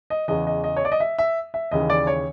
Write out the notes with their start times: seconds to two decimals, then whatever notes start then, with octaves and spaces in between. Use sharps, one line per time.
0.10 D#5
0.28 E2 C#3 E3 D#5
0.47 D#5
0.64 D#5
0.77 C#5
0.85 D5
0.92 D#5
1.00 E5
1.18 E5
1.54 E5
1.71 D#2 C#3 E3 D#5
1.90 D5
2.07 C#5